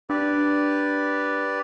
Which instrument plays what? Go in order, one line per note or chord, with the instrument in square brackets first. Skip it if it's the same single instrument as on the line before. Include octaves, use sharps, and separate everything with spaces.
[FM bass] D4 [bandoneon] G4 B4 D5